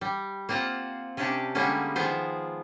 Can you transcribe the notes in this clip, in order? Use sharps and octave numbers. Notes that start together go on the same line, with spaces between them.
G3
A#3 C4 F4 C5 F#5
C3 C#4 D4 G4 A5
D3 G3 G#3 A#3 B3 C#4
D#3 F3 G#3 B3 C5